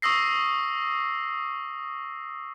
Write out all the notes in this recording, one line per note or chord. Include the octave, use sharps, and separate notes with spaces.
C#6 D#6 E6 A#6 C7